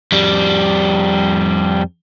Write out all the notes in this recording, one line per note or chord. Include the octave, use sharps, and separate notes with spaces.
F2 G3